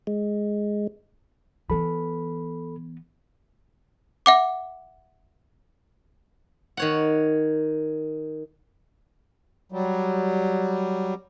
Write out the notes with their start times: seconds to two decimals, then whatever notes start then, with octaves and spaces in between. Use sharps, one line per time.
0.07 G#3
1.70 E3 B3 A4 B5
4.26 E5 F#5 D6
6.77 D#3 C#5 F#5
9.72 F#3 G3